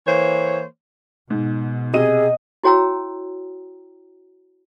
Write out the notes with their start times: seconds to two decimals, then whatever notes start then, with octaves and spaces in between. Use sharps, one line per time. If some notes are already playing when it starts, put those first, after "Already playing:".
0.07 E3 A#3 C5 C#5
1.30 G#2 B2
1.94 C3 G#4 D#5 D#7
2.64 E4 F#4 C#5 G5 A#5 E6